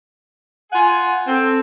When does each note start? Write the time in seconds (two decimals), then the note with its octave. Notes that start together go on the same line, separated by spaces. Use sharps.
0.72 F4 F#5 G#5
1.28 C4 A4